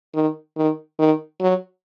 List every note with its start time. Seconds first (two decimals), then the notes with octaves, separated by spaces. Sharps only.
0.14 D#3
0.56 D#3
0.99 D#3
1.41 F#3